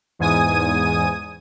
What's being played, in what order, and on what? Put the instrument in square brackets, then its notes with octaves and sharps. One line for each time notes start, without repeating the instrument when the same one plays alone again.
[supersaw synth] E2 G#2 G#5 D#6 D#7